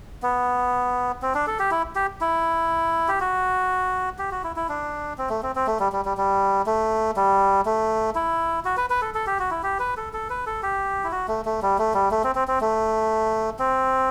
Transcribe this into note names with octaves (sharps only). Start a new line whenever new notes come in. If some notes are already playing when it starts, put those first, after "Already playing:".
B3
C4
D4
A4
G4
E4
G4
E4
G4
F#4
G4
F#4
E4
E4
D4
C4
A3
C4
C4
A3
G3
G3
G3
G3
A3
G3
A3
E4
F#4
B4
B4
A4
A4
G4
F#4
E4
G4
B4
A4
A4
B4
A4
G4
E4
F#4
A3
A3
G3
A3
G3
A3
C4
C4
C4
A3
C4